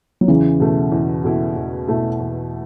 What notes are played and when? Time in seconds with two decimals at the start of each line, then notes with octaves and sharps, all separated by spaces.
0.21 F#3
0.28 E2 C#3 E3
0.60 B2 A3 E4
0.92 E2
1.24 B2 A3 E4
1.56 E2
1.88 B2 A3 E4
2.20 E2